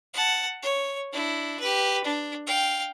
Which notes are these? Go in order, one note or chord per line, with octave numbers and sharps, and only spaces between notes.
F#5 A5
C#5
D4 E4
G4 B4
D4
F5 G5